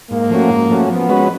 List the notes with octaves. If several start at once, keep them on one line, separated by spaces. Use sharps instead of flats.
G#2 A#3
F3 A3 C#4 F#4
G#2
F3 A3 C#4 F#4
F3 B3
G#3 C#4 F#4 B4